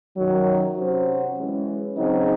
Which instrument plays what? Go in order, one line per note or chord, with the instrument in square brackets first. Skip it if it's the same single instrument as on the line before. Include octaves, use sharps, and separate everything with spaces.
[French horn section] F#2 D#3 F#3
C3 F#3 C#4 F#4 C5
E3 G#3 C#4
C#3 F#3 C4 D#4 G#4